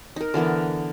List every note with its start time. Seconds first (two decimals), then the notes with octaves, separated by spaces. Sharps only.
0.16 D#4 A#4
0.34 D3 E3 B3 A#4